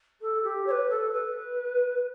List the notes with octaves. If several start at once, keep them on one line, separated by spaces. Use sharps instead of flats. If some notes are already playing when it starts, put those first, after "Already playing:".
A4
G4
C#5
B4
A4
B4